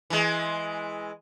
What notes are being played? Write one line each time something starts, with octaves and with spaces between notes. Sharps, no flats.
E3 G#3